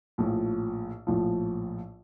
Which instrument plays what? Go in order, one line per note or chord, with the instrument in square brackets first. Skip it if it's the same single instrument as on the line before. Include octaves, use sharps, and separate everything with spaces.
[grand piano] A#1 A2 F3
A#1 A2 F3